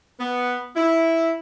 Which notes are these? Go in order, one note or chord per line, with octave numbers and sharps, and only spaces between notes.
B3
E4